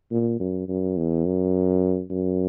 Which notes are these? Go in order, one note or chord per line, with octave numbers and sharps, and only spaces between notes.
A#2
F#2
F#2
E2
F#2
F#2